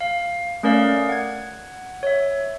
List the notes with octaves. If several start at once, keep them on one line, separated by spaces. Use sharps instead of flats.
F5
A3 C#4 A#4 D5 F5
F#5 G#6
C#5 E5